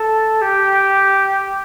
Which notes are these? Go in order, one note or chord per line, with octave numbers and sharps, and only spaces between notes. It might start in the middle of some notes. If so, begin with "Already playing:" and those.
Already playing: A4
G4